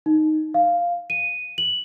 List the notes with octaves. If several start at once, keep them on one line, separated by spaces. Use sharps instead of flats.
D#4
F5
D#7
F#7